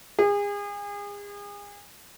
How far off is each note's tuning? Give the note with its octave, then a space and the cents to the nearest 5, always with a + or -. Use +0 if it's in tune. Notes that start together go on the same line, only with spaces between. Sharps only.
G#4 -35